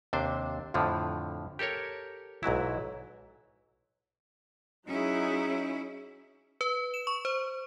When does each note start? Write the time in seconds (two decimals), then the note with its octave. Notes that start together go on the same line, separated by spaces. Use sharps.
0.13 D#2 C3 D4 C5
0.74 F2 A2 D3 F3
1.59 G4 A4 A#4 C#5
2.43 B1 G#2 F#3 E4
4.88 F#3 C#4 D#4 E4 G#4
6.61 B4
6.94 E7
7.07 C#6
7.25 C5